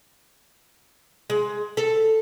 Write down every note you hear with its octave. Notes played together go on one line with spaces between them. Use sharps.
G#3
A4